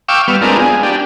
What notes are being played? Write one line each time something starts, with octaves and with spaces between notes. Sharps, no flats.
F5 G5 C#6 D6 E6
G3 B3 F6
G#3 B3 C4 D4 F4 A#4
G#4
D4 G4